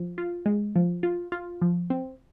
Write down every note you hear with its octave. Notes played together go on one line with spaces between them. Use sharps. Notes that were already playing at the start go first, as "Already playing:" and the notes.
Already playing: F3
F4
G#3
F3
F4
F4
F3
C4